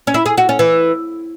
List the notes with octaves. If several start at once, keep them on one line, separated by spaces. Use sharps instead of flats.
C#4
E4
G#4
F#4
C#4
E3